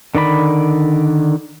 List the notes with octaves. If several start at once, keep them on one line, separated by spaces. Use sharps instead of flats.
D3 D#3 D5 B5